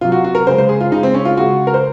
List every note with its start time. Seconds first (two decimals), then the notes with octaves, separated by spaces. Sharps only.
0.01 C3 F#3 F4
0.12 F#4
0.24 F#4
0.35 A#4
0.47 C#3 G#3 C5
0.58 C5
0.69 G#4
0.81 F4
0.92 C#3 G#3 D#4
1.03 C4
1.14 C#4
1.25 F4
1.37 C#3 G#3 F#4
1.67 A#4
1.74 C5